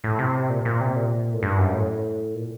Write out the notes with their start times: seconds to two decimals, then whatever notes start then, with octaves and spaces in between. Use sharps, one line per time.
0.04 A2
0.19 C3
0.50 A#2
0.65 A#2
0.81 C3
0.96 A#2
1.33 A2
1.43 G2
1.58 F#2
1.74 A2
2.35 A#2